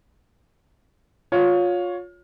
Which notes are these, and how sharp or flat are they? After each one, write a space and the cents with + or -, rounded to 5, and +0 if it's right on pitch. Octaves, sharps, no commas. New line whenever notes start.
F4 +25 C#5 +10